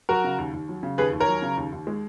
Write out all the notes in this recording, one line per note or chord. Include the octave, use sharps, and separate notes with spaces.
F#3 F#4 A#4
C#3
D#2
D#2
F#3
C#3
D#2 G#4 B4
D#2
A#4 C#5
F#3
C#3
D#2
D#2
G#3